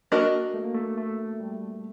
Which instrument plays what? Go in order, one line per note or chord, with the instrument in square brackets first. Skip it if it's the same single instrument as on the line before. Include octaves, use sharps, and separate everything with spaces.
[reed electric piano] A#3 [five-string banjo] D4 F#4 A#4 D#5
[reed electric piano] A3
A#3
A3
A3
G3